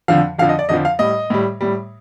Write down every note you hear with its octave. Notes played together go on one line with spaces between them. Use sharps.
F2 D3 F3 F5
F2 D3 F3 F5
D#5
D5
F2 D3 F3 D#5
F5
A2 G3 D#5
A2 G3
A2 G3